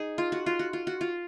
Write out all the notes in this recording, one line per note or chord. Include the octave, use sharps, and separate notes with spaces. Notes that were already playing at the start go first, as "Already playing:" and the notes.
Already playing: D#4 G#4
F4
F#4
F4
F#4
F4
F#4
F4